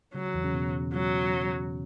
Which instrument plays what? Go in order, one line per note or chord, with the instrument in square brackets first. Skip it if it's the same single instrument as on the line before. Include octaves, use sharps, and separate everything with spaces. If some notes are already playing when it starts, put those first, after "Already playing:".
[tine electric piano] C#3 [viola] F#3
[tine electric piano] E2 E3
C#3 C#4
B2 B3
[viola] F#3